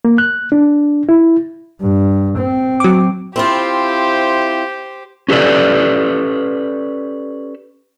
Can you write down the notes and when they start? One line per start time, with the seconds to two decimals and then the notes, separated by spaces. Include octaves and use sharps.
0.05 A#3
0.18 F#6
0.52 D4
1.09 E4
1.81 G2
2.37 C4
2.80 F#3 D6
3.36 C4 E4 F4 G4 C5
5.28 C#4 G4 A4 B4 D5